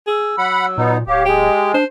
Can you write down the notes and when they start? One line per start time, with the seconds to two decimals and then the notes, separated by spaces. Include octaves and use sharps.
0.07 G#4 E6
0.38 F#3 F#5 B5
0.78 A#2 B3 D#4
1.07 D1 G4 C#5 F5 D6
1.26 G#3 G4 G#4
1.74 D4 C5